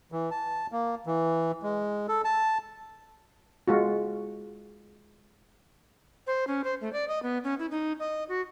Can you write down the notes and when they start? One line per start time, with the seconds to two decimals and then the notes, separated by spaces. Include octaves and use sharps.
0.12 E3
0.31 A5
0.72 A#3
1.07 E3
1.63 G#3
2.08 A4
2.25 A5
3.68 G#3 F4 F#4
6.27 C5
6.47 C#4
6.64 C5
6.81 A3
6.93 D5
7.08 D#5
7.23 B3
7.44 C#4
7.59 E4
7.71 D#4
7.99 D#5
8.29 F#4